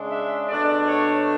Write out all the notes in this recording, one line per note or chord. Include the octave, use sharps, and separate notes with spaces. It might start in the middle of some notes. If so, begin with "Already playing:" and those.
Already playing: C#3 G#3 D4
E5
B2 A3 D4 D5
C#5